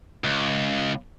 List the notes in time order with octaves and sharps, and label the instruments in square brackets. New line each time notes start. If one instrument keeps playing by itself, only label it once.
[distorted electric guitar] C#2